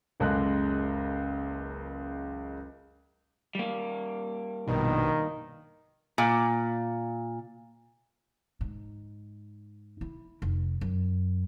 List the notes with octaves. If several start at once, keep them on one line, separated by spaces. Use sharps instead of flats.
F#1 C#2 G#3 A4 F#6
G3 A#3
A#1 G2 B2 D#3
A#2
G#2
E4
F1
F#2